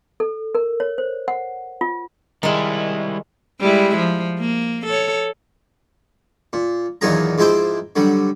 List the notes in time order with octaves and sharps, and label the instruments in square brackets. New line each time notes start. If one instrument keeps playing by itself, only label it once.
[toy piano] A4
A#4
C#5
C5
F#5
F4
[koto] D#3 G#3 [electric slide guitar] G3 E4
[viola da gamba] G3 G#3 E4
F3
A#3
A4 C#5
[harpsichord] A#2
E2 A#2 D#3 F#3 G#4 A#5
G#2 F3 G#3 E4 C5 D6
D3 F#3 G3